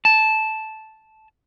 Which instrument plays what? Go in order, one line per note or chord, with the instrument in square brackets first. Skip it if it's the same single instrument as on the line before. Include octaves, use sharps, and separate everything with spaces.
[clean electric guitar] A5